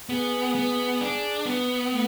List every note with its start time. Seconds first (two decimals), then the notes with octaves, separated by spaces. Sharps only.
0.09 B3 G#4
0.55 B3
1.01 D4
1.46 B3
1.92 A3